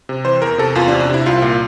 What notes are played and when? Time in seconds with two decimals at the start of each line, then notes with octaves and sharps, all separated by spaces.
0.09 C3
0.25 E3 C5
0.42 E2 A#4
0.58 C3 A4
0.75 E2 F4
0.88 D4
0.92 C3
1.00 D4
1.09 C3 E4
1.26 C2 F4
1.42 A#2